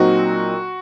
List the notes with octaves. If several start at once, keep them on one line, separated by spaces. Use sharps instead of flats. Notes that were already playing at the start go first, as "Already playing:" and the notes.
Already playing: A#2 F#3 C4 D#4 F#4